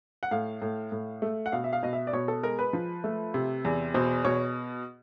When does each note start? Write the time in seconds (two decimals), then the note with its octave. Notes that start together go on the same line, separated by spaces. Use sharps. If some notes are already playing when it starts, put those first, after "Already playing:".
0.23 F#5
0.31 A2 F5
0.62 A2
0.92 A2
1.22 A3
1.46 F#5
1.52 B2 F5
1.64 E5
1.73 F5
1.83 B2 D#5
1.93 E5
2.07 D5
2.13 B2 C#5
2.28 A4
2.43 G#3 A#4
2.59 B4
2.73 F3
3.04 A3
3.34 C3
3.65 E2
3.94 B2 C5
4.25 B2 C#5